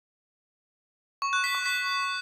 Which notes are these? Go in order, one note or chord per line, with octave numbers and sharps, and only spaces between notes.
C#6
F#6
B6
C#6
B6